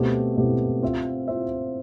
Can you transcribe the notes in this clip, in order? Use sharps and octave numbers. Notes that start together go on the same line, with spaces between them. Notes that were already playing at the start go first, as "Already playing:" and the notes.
Already playing: B2 A3 C4 G4
B2 A3 C4 G4
C4 F4 C5 E5
C4 F4 C5 E5